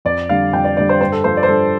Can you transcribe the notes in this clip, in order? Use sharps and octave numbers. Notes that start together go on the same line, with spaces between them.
F2 D5
D3 G3 F5
F2 G5
D5
D3 G3 D5
C5
G2 C5
A4
F3 C5
D5
C5
G2 A4